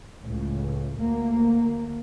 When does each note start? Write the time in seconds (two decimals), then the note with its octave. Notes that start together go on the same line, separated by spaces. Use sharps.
0.22 C#2 A2
0.99 D2 A#3